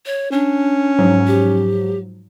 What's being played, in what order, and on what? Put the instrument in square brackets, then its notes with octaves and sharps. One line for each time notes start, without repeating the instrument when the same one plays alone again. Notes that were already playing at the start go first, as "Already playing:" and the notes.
[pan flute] C#5
[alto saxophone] C#4 [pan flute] D4
[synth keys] G#2 F3 F#3
[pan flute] G4